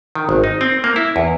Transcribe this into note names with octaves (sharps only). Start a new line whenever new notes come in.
D#3
G#1
D#4
C4
A#3
E4
E2